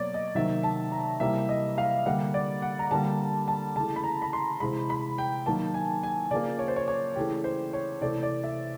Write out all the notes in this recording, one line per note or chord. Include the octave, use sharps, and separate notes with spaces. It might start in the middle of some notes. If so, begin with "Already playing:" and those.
Already playing: B2 F#3 A#3 C#5 D5
D#5
C3 D#3 F#3 A#3 E5
A5
A#5
C3 E3 G3 A#3 E5
D#5
F5
D3 G3 A#3 F#5
D5
F#5
A#5
D3 G3 A#3 A5
A5
C#3 E3 A3 A5
B5
A#5
B5
C6
C3 E3 G#3 B5
B5
G5
D#3 F#3 A#3 A5
G#5
G#5
C#3 F3 A#3 D5
C#5
C5
C#5
C#5
C#3 E3 A3 G4
C5
C#5
C3 E3 A3 D5
D5
E5